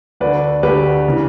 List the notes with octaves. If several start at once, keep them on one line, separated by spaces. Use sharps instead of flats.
D2 D3 B4 D5
D2 D3 G4 B4
C#3 E3